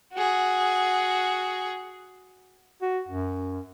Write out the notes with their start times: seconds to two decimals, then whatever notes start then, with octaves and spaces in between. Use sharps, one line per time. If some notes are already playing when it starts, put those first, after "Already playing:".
0.14 F#4 G#4
2.82 F#4
3.08 F#2